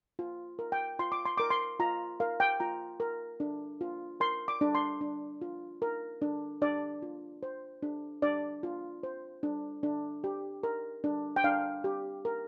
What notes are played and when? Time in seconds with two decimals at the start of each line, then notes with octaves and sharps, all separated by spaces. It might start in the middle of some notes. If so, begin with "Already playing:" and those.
0.19 F4
0.59 A#4
0.72 G5
0.99 F4 C6
1.12 D6
1.26 C6
1.38 A#4 D6
1.50 C6
1.80 F4 A#5
2.20 A#4 F5
2.40 G5
2.60 F4 A#5
3.00 A#4
3.40 D4
3.81 F4
4.20 A#4 C6
4.48 D6
4.61 D4
4.75 C6
5.01 D4
5.42 F4
5.82 A#4
6.22 D4
6.62 D4 D5
7.02 F4
7.43 C5
7.83 D4
8.22 D4 D5
8.63 F4
9.03 C5
9.43 D4
9.83 D4
10.24 G4
10.63 A#4
11.04 D4
11.36 G5
11.44 D4 F5
11.84 G4
12.25 A#4